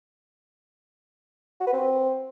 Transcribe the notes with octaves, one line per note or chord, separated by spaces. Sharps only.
F#4
B4
C4